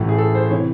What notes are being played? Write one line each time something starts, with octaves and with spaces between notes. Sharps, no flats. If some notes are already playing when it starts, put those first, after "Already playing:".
Already playing: A1 A2 E3
G#4
A4
C5
C3 E3 C#5